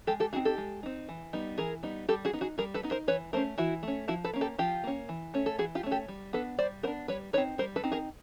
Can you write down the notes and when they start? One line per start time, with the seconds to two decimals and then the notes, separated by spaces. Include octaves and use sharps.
0.07 G#3 G4 A4
0.20 G4 A4
0.33 D#4 F#4 G#4
0.36 C4
0.45 G4 A4
0.58 G#3
0.83 C4 D#4
1.09 E3
1.33 G3 B3 D#4
1.58 E3 G#4 A#4
1.83 G3 B3 D#4
2.08 G3 G4 A4
2.25 F#4 G#4
2.33 B3 D#4
2.41 F#4 G#4
2.58 G3 G#4 A#4
2.74 A4 B4
2.83 B3 D#4
2.91 A#4 C5
3.08 E3 B4 C#5
3.33 A3 A#4 C5
3.37 C#4
3.58 E3 E4 F#4
3.83 A3 C#4
4.08 F3 E4 F#4
4.24 A4 B4
4.33 A#3 C#4
4.41 G4 A4
4.58 F3 F4 G4
4.84 A#3 C#4
5.09 E3
5.34 A3 C#4
5.46 A4
5.58 E3 F#4 G#4
5.75 F4 G4
5.83 A3 C#4
5.91 G4 A4
6.08 G3
6.33 B3 D4 A4 B4
6.59 G3 C5 D5
6.83 B3 A#4 C5
6.87 D4
7.08 G3 B4 C#5
7.33 D#4 B4 C#5
7.38 C4
7.58 G3 A#4 C5
7.76 A4 B4
7.84 C4 D#4
7.92 G#4 A#4